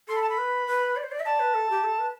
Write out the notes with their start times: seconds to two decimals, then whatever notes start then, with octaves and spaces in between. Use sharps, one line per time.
0.08 A4 C6
0.16 B5
0.22 A5
0.29 B5
0.38 B4
0.67 B4
0.96 D5
1.03 C5
1.12 D5
1.20 E5
1.25 D5 A5
1.40 B4
1.54 A4
1.70 G4
1.84 A4
1.99 B4